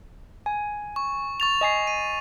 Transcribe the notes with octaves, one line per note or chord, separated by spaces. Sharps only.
G#5
C#6
C#6 A6 F7
D#5 G#5 C7
D#7